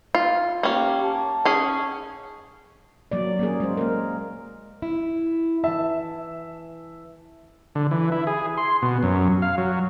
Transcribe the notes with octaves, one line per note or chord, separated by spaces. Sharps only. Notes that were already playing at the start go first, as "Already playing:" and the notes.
F4
A#3 C#4 G4
A5
C#4 G#4
F#3 A#3 D5
A#3 C#4 G#4
G#3 C5
A#3 A#4
E4
E3 E5 A5
D3
E3
E4
G#4
C6
B2
F#2
F5
F#3